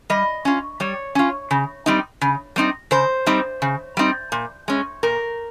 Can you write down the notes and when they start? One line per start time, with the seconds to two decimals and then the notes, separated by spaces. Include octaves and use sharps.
0.10 G3 D#5
0.45 C#4 F4
0.80 G3 C#5
1.15 C#4 F4
1.51 C#3
1.86 G3 C4 D#4
2.21 C#3
2.56 G3 C4 D#4
2.91 C#3 C5
3.26 G3 C4 D#4
3.62 C#3
3.97 G3 C4 D#4
4.32 A#2
4.68 G#3 C#4
5.03 A#2 A#4